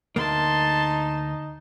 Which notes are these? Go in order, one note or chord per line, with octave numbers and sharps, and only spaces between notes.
D2 A#3 D#4 A5 C6